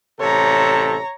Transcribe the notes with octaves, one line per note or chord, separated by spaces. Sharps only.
A1 C3 A4 C#5 A#5